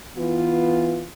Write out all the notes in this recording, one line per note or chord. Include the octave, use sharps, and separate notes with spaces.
E3 B3 F4